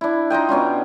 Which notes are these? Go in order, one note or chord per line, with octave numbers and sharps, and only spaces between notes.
D4 E4
D#4 F4 D#5 G5
B2 C#4 D4 F4